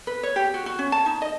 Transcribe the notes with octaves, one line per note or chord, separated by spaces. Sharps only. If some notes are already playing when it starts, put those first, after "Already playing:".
B4
C#5
G4
F#4
F#4
C#4
A5
D#4
D#5